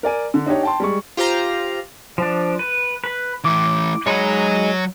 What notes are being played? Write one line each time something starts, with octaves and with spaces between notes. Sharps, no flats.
A#4 D5 G#5
D3
D4 D#4 G4 C#5
G5 A5 C6
G3 G#3 C#6
F4 G4 C5 F5 A#5
F3 D4
B4
B4
E3 A3 D6
F#3 G#3 D#4 C#5 B5